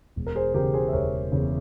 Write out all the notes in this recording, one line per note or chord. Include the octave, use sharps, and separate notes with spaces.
E1
A#4
G#4 C5
E2 C#3 G4 A#4
G#4 C5
E5
E1 A#4 C#5
E2 C#3